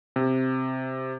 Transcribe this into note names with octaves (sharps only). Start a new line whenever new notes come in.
C3